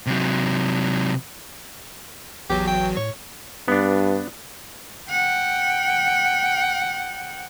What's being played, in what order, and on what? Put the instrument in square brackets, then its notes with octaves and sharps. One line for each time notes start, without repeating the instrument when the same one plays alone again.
[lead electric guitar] C3 F#3
[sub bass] A1 [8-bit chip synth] E2 F#3 [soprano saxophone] G4
[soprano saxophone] G5
[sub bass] A2 [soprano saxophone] C#5
[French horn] G2 [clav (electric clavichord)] B3 D4
[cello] F#5 G5